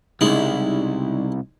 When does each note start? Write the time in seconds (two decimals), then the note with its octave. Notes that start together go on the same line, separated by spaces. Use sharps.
0.21 C2 F2 C#3 G3 G#3 D#4 E4